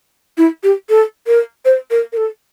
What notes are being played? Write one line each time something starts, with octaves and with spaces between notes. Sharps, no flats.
E4
G4
A4
A#4
C5
A#4
A#4
A4